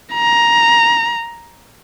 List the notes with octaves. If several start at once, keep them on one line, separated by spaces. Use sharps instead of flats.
A#5